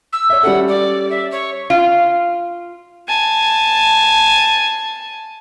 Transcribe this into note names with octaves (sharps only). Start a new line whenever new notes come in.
E6
C#5 E5
G3 C#4 A4 F#5
D5
E5
C#5
F4
G#5 A5